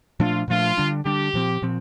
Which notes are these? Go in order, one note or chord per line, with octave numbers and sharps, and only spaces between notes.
A#2 F3 A3 D4 F4
A#2 F3 A3 D4 F4
D3 G3 D4
D3 G3 D4 G4
A#2 F3 C4
A#2 F3 C4